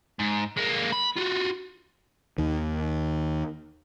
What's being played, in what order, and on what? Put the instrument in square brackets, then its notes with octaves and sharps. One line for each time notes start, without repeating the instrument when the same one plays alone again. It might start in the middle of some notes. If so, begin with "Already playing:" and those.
[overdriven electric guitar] G#2
G#3 A#3
B5
F4 F#4
[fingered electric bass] D#2 D#3